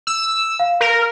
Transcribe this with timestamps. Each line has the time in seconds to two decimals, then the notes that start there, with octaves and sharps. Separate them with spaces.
0.07 E6
0.59 F5
0.81 A#4